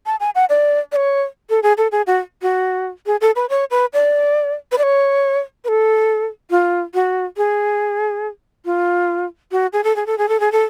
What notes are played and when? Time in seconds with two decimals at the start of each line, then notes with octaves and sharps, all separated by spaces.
0.06 A5
0.20 G#5
0.35 F#5
0.49 D5
0.92 D5
0.96 C#5
1.49 A4
1.63 G#4
1.77 A4
1.92 G#4
2.07 F#4
2.42 F#4
3.06 G#4
3.21 A4
3.36 B4
3.49 C#5
3.71 B4
3.93 D5
4.72 B4
4.78 D5
4.83 C#5
5.64 B4
5.68 A4
6.50 F4
6.94 F#4
7.37 G#4
8.65 F4
9.52 F#4
9.73 G#4
9.84 A4
9.96 G#4
10.06 A4
10.18 G#4
10.29 A4
10.40 G#4
10.52 A4